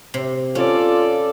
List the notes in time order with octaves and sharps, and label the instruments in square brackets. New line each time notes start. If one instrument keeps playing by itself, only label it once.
[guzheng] C3
[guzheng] C#4 [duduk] F4 [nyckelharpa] A4 D5